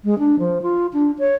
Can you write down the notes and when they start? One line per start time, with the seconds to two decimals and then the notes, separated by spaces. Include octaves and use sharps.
0.04 G#3
0.19 D4
0.39 F3
0.62 F4
0.93 D4
1.19 C#5